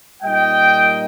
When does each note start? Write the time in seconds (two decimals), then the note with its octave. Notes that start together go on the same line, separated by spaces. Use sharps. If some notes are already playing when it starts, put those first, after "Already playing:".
0.23 A#2 G3 D#4 D#5 G5